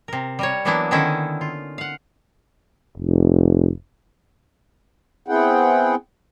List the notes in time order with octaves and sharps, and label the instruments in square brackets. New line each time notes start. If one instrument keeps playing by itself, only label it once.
[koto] C3 A#4
G3 A#4 C#5
E3 F#3 A#3 B3 D4 E4
D3 D#3 C#4 D#4 E4
F4
F5 F#5
[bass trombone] F1
[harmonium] B3 C4 E4 G#4 F#5 G5